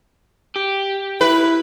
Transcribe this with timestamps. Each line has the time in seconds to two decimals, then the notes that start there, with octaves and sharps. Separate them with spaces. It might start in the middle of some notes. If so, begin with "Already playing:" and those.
0.56 G4
1.21 E4 B4